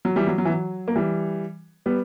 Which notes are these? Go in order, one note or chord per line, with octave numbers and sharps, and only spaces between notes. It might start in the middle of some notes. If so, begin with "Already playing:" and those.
F#3
E3 G3
F#3
F#3
E3
F#3
A#3
E3 G3
G3 B3